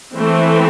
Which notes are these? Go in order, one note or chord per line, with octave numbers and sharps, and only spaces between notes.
E3 A3 C4